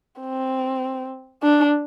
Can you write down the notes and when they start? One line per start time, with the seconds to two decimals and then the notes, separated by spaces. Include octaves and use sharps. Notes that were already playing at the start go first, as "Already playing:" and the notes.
0.20 C4
1.43 D4